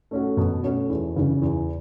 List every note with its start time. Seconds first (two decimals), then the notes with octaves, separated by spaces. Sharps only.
0.11 A3 C#4 F#4
0.37 B2
0.63 A3 C#4 F#4
0.90 E2
1.16 C#3 E3
1.42 E2